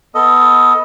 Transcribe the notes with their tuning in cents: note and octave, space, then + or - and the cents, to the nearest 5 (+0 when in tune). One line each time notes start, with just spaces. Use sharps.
B3 +0 A4 +15 D#5 +15